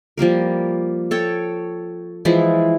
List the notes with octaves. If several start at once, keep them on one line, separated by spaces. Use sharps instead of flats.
F3 G3 A#3 A#4
A4 C#5 G5
E3 F3 G#3 E4